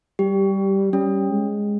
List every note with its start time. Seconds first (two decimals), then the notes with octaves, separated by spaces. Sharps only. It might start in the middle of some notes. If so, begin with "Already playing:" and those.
0.19 G3 G4
0.93 G3 C#4
1.31 G#3